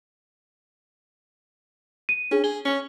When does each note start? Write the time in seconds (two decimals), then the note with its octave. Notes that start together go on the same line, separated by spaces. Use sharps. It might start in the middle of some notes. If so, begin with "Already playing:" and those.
2.09 D#7
2.31 C#4 D4 G#4
2.44 G#4 G7
2.65 C#4